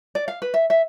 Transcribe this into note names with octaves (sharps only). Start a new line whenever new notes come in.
D5
F5
B4
E5
E5